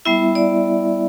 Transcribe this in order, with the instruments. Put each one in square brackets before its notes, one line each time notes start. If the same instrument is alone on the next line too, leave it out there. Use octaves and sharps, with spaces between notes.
[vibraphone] G3 B3 E4 E5
D5